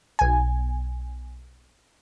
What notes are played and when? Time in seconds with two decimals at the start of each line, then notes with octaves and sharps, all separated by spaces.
0.19 B1 G#5